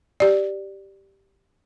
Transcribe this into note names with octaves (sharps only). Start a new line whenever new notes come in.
G4 D5